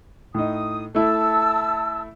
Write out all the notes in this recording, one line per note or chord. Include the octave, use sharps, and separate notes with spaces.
A2 D#4 D#6
A3 E4 A5 E6